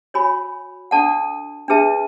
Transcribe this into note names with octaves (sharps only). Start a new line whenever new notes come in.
F#4 C#5 G#5 B5
D4 A4 D5 F#5 A5
D4 G#4 B4 E5 A5